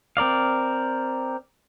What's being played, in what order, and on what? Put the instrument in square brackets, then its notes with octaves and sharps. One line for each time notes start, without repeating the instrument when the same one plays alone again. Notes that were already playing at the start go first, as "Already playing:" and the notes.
[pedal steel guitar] C4 A#4 D5 F5